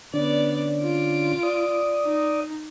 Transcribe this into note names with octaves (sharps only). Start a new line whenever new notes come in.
D3 B3 C#4 D4 D5
F4 D7
D5 D#6
D#4